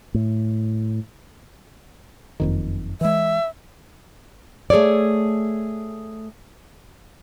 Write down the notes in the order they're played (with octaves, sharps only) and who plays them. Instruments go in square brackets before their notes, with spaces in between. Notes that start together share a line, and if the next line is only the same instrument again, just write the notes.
[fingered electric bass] A2
[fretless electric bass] F#1 F2 D#3
[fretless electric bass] E3 G#3 [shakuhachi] E5
[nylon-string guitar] A3 G#4 A4 C#5 D5